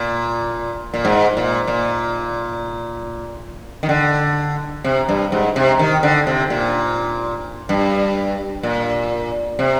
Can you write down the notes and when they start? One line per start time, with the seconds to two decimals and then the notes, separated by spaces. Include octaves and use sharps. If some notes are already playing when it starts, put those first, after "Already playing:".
Already playing: A#2
0.94 A#2
1.05 G#2
1.37 A#2
1.67 A#2
3.83 D#3
3.89 D3
4.84 C3
5.09 G2
5.32 G#2
5.56 C3
5.79 D#3
6.03 D3
6.27 C3
6.50 A#2
7.69 G2
8.63 A#2
9.59 C3